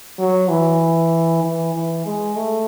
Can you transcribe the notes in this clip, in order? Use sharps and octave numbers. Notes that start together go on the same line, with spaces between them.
F#3
E3
E3
E3
G#3
A3